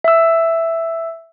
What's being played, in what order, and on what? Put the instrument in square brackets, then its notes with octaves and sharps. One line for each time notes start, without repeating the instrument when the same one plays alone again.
[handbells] E5 E6